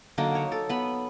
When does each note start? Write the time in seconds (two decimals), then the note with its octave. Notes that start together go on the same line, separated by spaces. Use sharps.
0.18 D3 F#3 A#3 D#4
0.35 C#5
0.52 A4
0.69 B3 B5